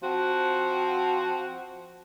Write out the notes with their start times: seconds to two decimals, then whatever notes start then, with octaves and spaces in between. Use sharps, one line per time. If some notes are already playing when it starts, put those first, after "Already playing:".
0.02 F3 C4 F#4